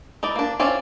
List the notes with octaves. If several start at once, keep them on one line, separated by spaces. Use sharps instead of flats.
D#4 E4 D5
A#3 D4
C4 C#4 E4 F4 D5